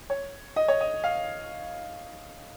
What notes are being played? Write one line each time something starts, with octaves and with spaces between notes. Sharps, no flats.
C#5
D#5
C#5
D#5
F5